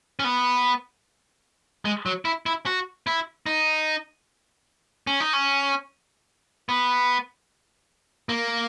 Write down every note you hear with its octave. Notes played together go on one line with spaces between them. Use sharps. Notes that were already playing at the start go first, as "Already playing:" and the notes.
C#4
B3
G#3
F#3
E4
E4
F#4
E4
D#4
C#4
D#4
C#4
B3
A#3